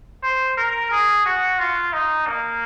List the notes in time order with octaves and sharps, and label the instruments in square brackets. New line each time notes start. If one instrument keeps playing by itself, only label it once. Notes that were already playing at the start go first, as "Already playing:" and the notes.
[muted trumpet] C5
A#4
G#4
F#4
F4
D#4
A#3